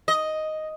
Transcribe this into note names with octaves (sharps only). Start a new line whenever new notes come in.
D#5